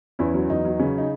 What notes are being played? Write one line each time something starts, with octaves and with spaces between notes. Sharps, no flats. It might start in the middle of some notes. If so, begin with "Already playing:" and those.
E2 C#4 E4
F#3
E2 D#4
F#3
C#3 C#4
D#4